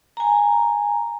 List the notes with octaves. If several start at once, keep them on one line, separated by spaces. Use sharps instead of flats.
G#5 A#5